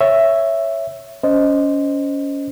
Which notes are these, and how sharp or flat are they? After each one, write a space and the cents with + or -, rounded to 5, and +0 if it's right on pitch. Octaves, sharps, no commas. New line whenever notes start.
C#5 +0 E5 +5
C#4 +20 C5 +0 D#5 -5